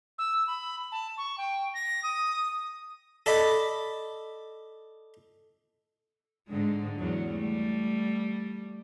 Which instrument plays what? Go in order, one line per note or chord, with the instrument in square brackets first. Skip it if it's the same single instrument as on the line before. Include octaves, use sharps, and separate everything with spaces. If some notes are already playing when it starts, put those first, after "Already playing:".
[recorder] E6
B5
A5
C#6
G5
A#6
D#6
[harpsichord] A4 D5 D#5 B5
[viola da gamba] G#2 D3 G#3
E2 F#3
G3 A3